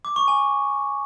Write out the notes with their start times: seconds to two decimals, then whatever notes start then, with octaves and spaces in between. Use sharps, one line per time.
0.05 D6
0.16 C#6
0.28 G#5